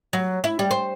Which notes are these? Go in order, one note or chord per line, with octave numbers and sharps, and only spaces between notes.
F#3
E4
G3
C5